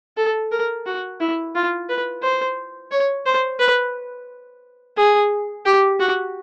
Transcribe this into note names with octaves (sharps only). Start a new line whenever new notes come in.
A4
A#4
F#4
E4
F4
B4
C5
C#5
C5
B4
G#4
G4
F#4